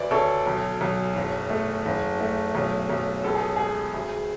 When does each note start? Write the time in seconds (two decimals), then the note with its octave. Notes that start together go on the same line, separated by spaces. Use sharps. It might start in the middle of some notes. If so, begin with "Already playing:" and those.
Already playing: D2 B4 D5
0.11 D2 A4 C#5
0.46 B1
0.81 B1
1.15 F#1
1.50 A3
1.85 F#1
2.20 A3
2.55 B1
2.89 B1
3.24 C#2 A4
3.35 G#4
3.56 G#3 G#4
3.94 D2